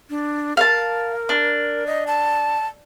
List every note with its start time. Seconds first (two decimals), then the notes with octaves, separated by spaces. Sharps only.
0.10 D4
0.57 A#4 F5 A5
1.29 D4
1.87 D#5
2.07 A5